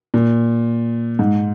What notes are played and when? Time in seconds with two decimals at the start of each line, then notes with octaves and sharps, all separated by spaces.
0.14 A#2
1.19 G#2